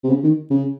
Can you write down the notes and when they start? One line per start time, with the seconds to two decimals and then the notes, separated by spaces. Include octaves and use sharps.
0.04 C3
0.10 C#3
0.23 D#3
0.50 C#3